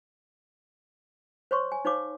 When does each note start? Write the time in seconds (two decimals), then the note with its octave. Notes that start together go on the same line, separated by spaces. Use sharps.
1.51 C5 C#5 C6 C#6
1.72 G#5
1.85 D#4 C5 C#5 F5 D6